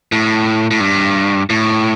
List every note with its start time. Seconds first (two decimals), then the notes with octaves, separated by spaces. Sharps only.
0.12 A2
0.71 A2
0.80 G2
1.50 A2